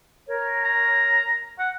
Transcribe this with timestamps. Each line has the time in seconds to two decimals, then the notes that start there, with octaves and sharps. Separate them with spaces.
0.27 A#4 C#5
0.64 A#5
1.59 F#5